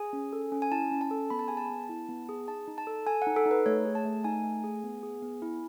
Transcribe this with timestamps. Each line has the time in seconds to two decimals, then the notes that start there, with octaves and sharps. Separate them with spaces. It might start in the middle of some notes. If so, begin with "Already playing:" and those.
Already playing: G#4 G#5
0.13 C#4
0.33 A4
0.52 C#4
0.62 G#5
0.72 E4 A5
0.91 C#4
1.01 A5
1.11 A4
1.30 B3 B5
1.39 A5
1.48 G#4 G#5
1.57 A5
1.69 B3
1.89 E4
2.09 B3
2.29 G#4
2.48 D#4 A5
2.68 D#4
2.78 A5
2.87 A4
3.07 A4 G#5
3.22 F#5
3.27 D#4
3.36 A4
3.46 D#4
3.51 B4
3.66 A3 C#5
3.85 G#4
3.95 A5
4.05 A3
4.24 D#4 G#5
4.44 A3
4.64 G#4
4.84 B3
5.03 G#4
5.22 B3
5.42 E4